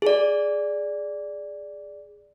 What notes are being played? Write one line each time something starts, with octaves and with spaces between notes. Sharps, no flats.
G#4 D5